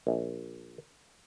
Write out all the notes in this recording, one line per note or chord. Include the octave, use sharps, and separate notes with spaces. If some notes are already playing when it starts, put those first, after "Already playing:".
A#1